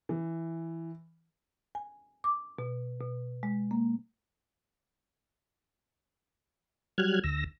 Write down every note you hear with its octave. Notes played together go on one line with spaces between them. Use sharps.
E3
G#5
D6
B2
B2
G#3
A#3
F#3 G3 F6 F#6 G#6
D2 E6 A#6